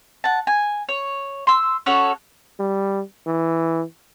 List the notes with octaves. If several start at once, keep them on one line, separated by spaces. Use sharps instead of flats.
F#5 A5
G#5
C#5
C6 E6
C#4 F#4 A4 C#5
G3
E3